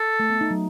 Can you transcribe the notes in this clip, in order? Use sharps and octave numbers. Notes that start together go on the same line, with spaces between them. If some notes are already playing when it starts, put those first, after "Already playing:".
Already playing: A4
A3
B3
D#4
F#3